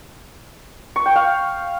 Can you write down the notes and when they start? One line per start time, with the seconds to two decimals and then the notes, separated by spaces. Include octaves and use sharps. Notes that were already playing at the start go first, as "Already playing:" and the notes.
0.96 C#6
1.06 G5
1.16 F5